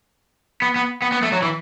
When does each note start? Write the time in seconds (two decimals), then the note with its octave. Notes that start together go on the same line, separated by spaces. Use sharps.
0.62 B3
0.76 B3
1.02 B3
1.12 B3
1.23 A3
1.32 F#3
1.42 E3